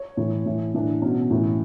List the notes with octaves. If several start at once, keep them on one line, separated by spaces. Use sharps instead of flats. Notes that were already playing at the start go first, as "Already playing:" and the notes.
Already playing: C#5
A2 E3
A2 E3
A2 E3 D4
B2 C#4
A2 E3